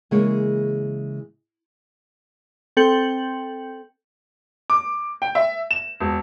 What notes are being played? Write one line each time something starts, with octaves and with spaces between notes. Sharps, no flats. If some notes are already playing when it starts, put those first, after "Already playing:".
C#3 E3 G#3 A#3 G#4 C#5
C4 A4 G5 G6 C#7 F#7
D6
G5
E5
E7
E1